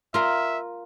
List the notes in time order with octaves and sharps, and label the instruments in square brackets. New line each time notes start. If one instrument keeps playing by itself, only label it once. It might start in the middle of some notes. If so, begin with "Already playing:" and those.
[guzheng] F4 A#4 C6 [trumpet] E5